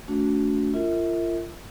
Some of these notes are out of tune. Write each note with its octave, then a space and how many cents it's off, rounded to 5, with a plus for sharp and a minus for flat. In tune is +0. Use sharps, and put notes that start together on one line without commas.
A3 +0 D4 -40 F#4 -10
F4 -30 A#4 -35 E5 -30